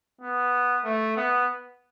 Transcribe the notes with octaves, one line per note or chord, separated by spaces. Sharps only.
B3
A3
B3